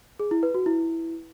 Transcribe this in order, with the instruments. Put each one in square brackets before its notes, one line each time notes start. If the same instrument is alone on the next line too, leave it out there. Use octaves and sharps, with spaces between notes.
[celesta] G#4
E4
B4
F#4
E4